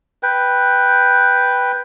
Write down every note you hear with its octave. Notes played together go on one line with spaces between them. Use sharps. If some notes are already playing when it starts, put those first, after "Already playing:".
B4 G5